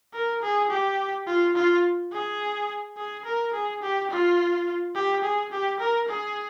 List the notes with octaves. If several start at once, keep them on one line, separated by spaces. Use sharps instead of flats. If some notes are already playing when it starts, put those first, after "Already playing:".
A#4
G#4
G4
F4
F4
G#4
G#4
A#4
G#4
G4
F4
G4
G#4
G4
A#4
G#4